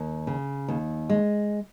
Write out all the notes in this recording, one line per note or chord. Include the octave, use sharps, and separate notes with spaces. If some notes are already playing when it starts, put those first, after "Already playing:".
Already playing: D#2
C#3
D#2
G#3